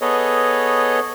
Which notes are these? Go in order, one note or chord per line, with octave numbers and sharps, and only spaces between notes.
B3 G#4 A4 B4 C#5 D#5